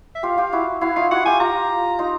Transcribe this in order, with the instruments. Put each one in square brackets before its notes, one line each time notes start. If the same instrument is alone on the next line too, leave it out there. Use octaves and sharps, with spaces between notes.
[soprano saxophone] E5
[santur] F4 G4 [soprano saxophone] F5
[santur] F4 G4
E4 F#4
[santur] E4 F#4 [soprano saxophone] F5
[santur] D#4 F4 [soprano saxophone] F5
[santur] E4 F#4 [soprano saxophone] F#5
[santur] F4 G4 [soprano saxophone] G#5
[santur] F4 G4 [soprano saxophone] A#5
[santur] D#4 F4